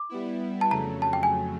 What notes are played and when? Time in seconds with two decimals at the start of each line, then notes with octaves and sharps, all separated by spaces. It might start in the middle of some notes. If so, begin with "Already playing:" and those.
Already playing: D6
0.09 G3 B3 E4
0.61 A5
0.71 F2 C#3 F#3 A3 A#5
1.02 A5
1.13 G5
1.23 G#5